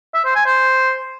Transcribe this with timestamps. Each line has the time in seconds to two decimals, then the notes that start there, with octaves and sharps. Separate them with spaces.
0.14 E5
0.25 C5
0.35 G#5
0.46 C5